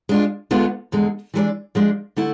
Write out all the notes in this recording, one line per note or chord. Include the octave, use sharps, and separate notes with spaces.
G#3 D4 F4
D2 D3 G#3 B3 F4
E2 D3 G#3
E3 G#3 D4 A4 D5
F3 G#3 D4
D3 A3 E4